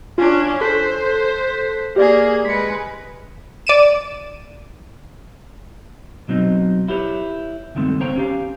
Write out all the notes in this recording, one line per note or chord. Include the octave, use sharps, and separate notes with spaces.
C#4 D4 F4
A4 C5 F#6 B6
A#3 G4 G#4 D5
G#3 B4 B6 C#7
D5 D#7 E7
B2 F#3 C4 D#4
E4 G4 B4 C#5
C#2 G2 D#3 A3 C4
A#3 C4 C5 C#5 G5 A#5
C#4 G4 F5